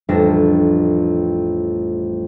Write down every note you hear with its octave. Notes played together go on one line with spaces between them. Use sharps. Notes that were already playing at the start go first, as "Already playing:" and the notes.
A1 F2 G3 D4 A#6